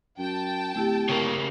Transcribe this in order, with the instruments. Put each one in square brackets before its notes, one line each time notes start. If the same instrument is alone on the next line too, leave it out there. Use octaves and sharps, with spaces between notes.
[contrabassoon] F#2 [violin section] G5 A5
[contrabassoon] D1 [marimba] A3 E4 G4
[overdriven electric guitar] C#3 A#3